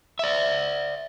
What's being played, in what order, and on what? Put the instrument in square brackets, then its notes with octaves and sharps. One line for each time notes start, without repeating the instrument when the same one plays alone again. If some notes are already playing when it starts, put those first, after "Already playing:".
[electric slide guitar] D5 E5